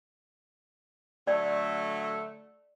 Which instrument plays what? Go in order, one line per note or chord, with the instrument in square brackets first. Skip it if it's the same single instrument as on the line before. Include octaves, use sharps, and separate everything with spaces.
[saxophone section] D3 F#3 A3 [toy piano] D5